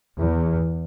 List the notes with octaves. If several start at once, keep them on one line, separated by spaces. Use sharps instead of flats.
E2